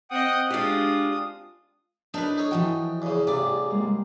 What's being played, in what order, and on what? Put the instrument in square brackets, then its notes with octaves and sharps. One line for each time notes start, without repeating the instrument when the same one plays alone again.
[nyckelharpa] C4 D#5 [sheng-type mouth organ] F#5 G5 D#6
[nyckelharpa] G#3 F4 [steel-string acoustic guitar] D4 G4 [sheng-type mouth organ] D#6
[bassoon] F#2 [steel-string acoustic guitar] D4 [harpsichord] D#4 A#4 B4
[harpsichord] D#4 A4 C#5
[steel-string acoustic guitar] E3 F3 G5 [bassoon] F#4
[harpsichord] E2 C#3 [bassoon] G#4
[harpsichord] A1 G2 D5 [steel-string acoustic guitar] C3
[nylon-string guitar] G3 G#3 A#3